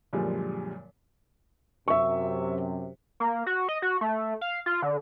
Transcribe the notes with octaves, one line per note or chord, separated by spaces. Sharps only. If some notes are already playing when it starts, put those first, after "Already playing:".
F#2 A#2 D3 F3 G3 G#3
F#2 C3 E5 C#6
A#3
F#4
D#5
F#4
A3
F5
F4
D3